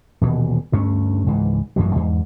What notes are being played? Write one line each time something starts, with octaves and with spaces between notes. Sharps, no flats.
D#1 B2 E3
D2 G2 A3 C#4
C#2 G#2 E3
A1 F#2 E3 F#3
E2 G#2